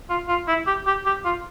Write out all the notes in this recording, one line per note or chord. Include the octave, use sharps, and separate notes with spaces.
F4
F4
E4
G4
G4
G4
F4